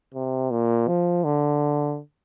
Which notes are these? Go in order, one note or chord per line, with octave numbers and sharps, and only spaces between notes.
C3
A#2
F3
D3